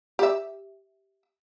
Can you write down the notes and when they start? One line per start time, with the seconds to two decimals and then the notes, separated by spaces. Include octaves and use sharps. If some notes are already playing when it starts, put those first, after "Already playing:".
0.19 G4 E5